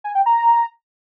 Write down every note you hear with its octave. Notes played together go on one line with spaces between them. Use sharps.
G#5
G5
A#5